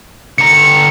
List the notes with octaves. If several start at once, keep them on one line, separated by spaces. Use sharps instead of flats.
D3 A#5 C#7